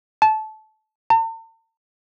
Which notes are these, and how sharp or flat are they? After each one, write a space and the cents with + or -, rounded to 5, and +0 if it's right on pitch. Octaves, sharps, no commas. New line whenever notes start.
A5 -20
A5 +45